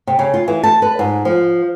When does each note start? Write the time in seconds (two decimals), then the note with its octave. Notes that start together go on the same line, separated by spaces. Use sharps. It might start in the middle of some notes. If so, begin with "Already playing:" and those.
0.07 C3
0.19 C#3
0.34 F4
0.48 E3
0.63 A5
0.82 B4
0.99 G#2
1.25 F3